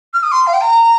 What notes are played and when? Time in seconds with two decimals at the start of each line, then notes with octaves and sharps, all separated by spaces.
0.13 F6
0.23 D#6
0.32 C6
0.47 F5
0.53 G5
0.61 A#5